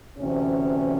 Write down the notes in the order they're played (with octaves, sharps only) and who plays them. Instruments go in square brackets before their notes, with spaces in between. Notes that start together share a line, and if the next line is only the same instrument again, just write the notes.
[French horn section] D2 C3 E3 C#4